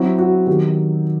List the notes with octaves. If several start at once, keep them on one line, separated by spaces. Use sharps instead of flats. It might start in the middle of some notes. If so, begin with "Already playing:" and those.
Already playing: F#3 C4 E4 F#4
F#4
D#3 F#3 B3 G4